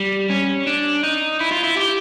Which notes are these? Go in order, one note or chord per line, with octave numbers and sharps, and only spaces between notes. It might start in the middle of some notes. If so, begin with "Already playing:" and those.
Already playing: G3
C#4
D4
D#4
E4
F4
E4
G4